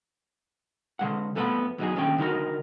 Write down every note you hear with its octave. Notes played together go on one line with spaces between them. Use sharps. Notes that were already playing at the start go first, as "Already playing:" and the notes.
D3 G#3 F#5
F2 A3 B3 E4 B5
E2 F#3 D#4 G#4
D#2 D3 C#4 G5
D3 D#4 F#4 A#4